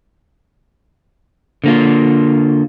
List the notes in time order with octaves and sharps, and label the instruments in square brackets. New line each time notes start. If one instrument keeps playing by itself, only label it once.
[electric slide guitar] D3 A#3 F4